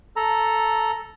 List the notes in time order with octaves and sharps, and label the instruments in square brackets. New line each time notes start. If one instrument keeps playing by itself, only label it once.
[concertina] A4 A#5